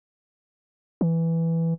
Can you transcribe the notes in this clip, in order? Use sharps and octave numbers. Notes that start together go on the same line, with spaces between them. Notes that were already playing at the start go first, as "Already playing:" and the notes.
E3